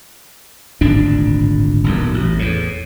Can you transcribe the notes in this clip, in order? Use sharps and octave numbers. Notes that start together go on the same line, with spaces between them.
D1 G#1 A#2 D4
D#1 B1 F#2
A1
E2 A2